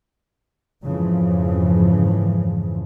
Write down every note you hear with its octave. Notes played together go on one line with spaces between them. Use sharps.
F2 G#2 C#3 E3 F3